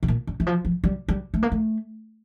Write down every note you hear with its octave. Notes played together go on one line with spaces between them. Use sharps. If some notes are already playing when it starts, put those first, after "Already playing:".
A2
A#2
D3
E3
F3
F3
G3
G3
A3
A#3
A3